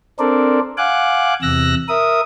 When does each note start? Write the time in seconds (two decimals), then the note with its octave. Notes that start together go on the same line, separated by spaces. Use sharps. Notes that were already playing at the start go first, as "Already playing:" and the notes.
0.19 C4 D4 A4 A#4 C5 D5
0.77 F5 F#5 G#5 D6 F#6
1.42 E2 C3 E6 F#6 A#6
1.89 A#4 E5 D#6